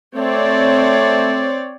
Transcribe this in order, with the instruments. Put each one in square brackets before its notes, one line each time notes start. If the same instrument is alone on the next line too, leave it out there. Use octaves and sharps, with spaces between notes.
[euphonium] A3 [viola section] C4 C#5 D5